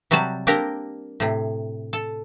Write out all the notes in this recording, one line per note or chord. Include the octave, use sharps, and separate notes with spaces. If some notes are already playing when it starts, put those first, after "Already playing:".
C3 F#3 G3 F#4 A5
A#3 C4 D4 G4 A#4
A2 C3
A4